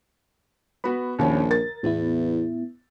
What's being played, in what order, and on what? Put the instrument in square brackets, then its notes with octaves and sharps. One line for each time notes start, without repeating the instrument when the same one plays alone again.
[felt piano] B3 F#4 [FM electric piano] B5
[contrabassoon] A#1 [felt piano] D#2 C#4
[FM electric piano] A#4 [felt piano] A6
[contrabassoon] E2 [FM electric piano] A2 B3 E4